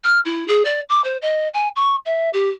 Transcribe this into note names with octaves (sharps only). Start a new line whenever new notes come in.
F6
E4
G#4
D5
D6
C5
D#5
G#5
C#6
E5
G4